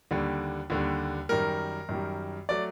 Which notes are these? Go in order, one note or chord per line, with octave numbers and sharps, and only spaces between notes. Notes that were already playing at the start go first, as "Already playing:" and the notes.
D#2 D3 G3
D#2 D3 G3
F#2 D#3 G3 A#4
F#2 D#3 G3
F#3 A3 D5